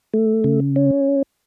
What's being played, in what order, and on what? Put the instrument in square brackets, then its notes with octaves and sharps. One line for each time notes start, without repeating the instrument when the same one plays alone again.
[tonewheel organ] A3
C#3
C#4